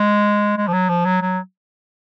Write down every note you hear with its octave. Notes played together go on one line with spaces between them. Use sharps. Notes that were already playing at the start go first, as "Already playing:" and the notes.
Already playing: G#3
G#3
F3
F#3
F3
F#3
F#3